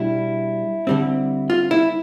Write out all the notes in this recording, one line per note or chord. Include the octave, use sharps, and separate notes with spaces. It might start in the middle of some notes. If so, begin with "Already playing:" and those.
Already playing: B2 G3 D4 E4
D3 G3 C4
F4
E4